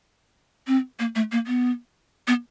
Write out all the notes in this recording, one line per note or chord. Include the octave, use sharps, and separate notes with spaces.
C4
A#3
A3
A#3
B3
B3